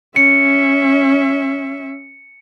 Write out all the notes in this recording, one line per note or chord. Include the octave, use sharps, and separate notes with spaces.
C#4 E5 C#7